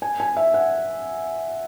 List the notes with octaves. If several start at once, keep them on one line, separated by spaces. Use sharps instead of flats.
G#5
G#5
E5
F#5